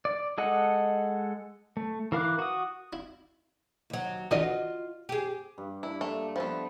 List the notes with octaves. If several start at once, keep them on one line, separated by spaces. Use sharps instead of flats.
D5
G#3 A4 D#5 F#5
A3
E3 A#4 F5 D6 F#6
F#4 D#6
E4
D#2 F#3
D3 E3 F4 F#4 D#5
G4 G#4
G2
D4 E4
A3 A#3
F3 G3 A3 B3 E4 B4